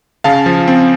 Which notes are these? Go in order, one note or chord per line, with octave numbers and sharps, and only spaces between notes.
C#3 F5 A5
F3
C4